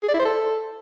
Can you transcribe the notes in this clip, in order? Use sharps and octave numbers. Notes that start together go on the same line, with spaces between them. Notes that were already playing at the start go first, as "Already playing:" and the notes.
G#4
D5
E4
C5
A4